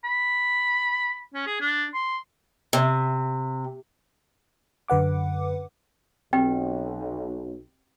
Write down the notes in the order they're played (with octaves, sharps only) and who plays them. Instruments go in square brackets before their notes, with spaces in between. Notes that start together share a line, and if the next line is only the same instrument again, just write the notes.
[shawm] B5
C#4
G#4
D4
C6
[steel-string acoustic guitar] C3
[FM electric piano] F#2 D3 B4 F#5 D6
[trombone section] B1 [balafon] C4 [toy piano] G4 B4 G5